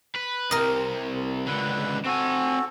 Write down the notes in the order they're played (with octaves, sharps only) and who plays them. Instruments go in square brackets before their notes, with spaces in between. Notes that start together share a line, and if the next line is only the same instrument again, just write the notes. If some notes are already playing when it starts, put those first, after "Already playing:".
[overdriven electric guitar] B4
[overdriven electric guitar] C2 C3 [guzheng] A#4 D#5
[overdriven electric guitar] C#2 D3 [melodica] B4
[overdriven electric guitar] C4 G#5 [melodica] F#4 A4